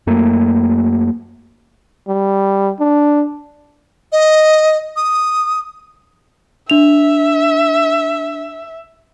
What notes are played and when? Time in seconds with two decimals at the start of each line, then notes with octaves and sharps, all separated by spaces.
0.07 F#2 A3 A#3
2.08 G3
2.79 D4
4.12 D#5
4.96 D#6
6.70 D4 E5 F7